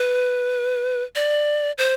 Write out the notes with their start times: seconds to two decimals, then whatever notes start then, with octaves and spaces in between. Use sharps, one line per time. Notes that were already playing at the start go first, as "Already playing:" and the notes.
Already playing: B4
1.15 D5
1.78 C5